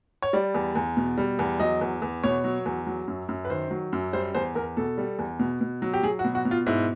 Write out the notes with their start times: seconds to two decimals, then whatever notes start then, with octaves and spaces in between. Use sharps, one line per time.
0.22 C#5
0.33 G3 D5
0.54 E2
0.75 E2
0.97 B2
1.18 G3
1.39 E2
1.60 F#3 D#5
1.81 E2
2.02 E2
2.24 B2 C#5
2.44 F#3
2.66 E2
2.87 F#3
3.08 F#2
3.29 F#2
3.45 B4
3.50 D#3 C5
3.71 F#3
3.93 F#2
4.13 G3 C5
4.35 E2 C5
4.55 E2 A#4
4.77 B2 A4
4.98 G3
5.19 E2
5.40 B2
5.61 B2
5.82 F#3
5.93 G4
6.03 F#3 G#4
6.19 F#4
6.25 B2
6.35 F#4
6.45 B2
6.51 F4
6.67 G#2 E4